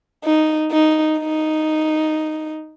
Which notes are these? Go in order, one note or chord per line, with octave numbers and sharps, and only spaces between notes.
D#4
D#4
D#4